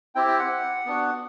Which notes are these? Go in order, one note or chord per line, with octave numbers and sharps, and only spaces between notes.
C4 E4 G4 G5
G5
F#5
B3 D4 F#4